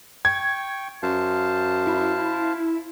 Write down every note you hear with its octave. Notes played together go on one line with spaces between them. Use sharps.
G5 C#6 G#6
F#2 C5 F5 A5
E4